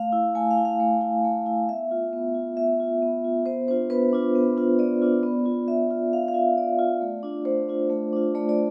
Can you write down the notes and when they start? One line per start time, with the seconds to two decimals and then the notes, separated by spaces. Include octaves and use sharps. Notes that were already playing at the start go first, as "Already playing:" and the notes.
Already playing: A3 F5
0.12 E4
0.35 A3 G#5
0.51 F5
0.58 E4
0.65 F5
0.80 A3
1.01 E4
1.24 A3
1.46 E4
1.69 B3 E5
1.91 F4
2.13 B3
2.34 F4
2.57 B3 E5
2.80 F4
3.02 B3
3.24 F4
3.46 B3 C5
3.68 D4 F4 C5
3.90 B3 B4
4.13 D4 F4
4.35 B3
4.57 D4 F4
4.79 B3 D5
5.02 D4 F4
5.23 B3
5.46 F4
5.68 B3 E5
5.90 F4
6.12 B3 F5
6.28 F5
6.34 F4 E5
6.57 B3 D5
6.79 F4
7.01 A3
7.23 D4 F4
7.45 A3 C5
7.69 D4 F4
7.90 A3
8.13 D4 F4
8.35 A3 D5
8.49 D5